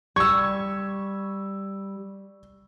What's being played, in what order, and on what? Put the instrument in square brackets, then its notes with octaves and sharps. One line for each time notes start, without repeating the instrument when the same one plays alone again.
[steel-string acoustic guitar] G3 [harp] C#6 [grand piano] E6 G#6